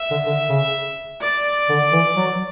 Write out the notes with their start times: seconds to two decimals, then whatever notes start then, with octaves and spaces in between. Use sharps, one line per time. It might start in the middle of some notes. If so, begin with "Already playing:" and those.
Already playing: E5
0.10 D3
0.26 D3
0.49 C#3
1.21 D5
1.69 D3
1.92 E3
2.16 F#3